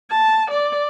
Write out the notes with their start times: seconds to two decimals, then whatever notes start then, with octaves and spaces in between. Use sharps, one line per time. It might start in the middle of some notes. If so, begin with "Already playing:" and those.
0.10 A5
0.51 D5